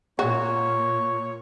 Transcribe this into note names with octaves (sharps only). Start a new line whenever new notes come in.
A#2 F#4 C#5